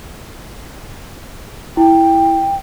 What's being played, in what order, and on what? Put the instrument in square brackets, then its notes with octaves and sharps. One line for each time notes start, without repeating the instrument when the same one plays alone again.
[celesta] E4 [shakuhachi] G5